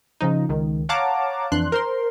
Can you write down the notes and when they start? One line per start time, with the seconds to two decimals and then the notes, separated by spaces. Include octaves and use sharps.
0.21 C#3 F3 D#4
0.49 C#2 D#3
0.89 C#5 F5 F#5 A5 A#5 D6
1.52 F2 E3 D4 C6 F#6
1.72 A#4 C5 C6